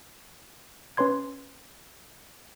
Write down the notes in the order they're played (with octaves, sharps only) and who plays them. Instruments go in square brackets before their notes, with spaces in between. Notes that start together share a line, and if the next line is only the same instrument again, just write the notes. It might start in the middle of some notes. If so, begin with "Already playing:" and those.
[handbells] C#4 B4 C#5 C6 G#6